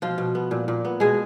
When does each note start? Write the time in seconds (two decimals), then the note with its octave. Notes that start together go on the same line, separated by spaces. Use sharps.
0.02 B2 F3 F4
0.18 B2
0.35 B3
0.51 A#2
0.68 A#2
0.85 B3
1.00 B2 G#3 G#4